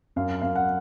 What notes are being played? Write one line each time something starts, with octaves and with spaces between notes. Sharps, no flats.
F#2 F5
F#2 F5
F#5